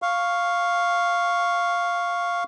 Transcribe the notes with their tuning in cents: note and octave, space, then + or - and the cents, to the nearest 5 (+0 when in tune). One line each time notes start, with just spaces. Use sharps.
F5 +0 C#6 +0